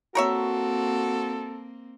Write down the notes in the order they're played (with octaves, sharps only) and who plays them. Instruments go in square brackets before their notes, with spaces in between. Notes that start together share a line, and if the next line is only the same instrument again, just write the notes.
[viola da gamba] A#3 C4 [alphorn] F#4 [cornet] A4 [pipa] A#4 C#5 E5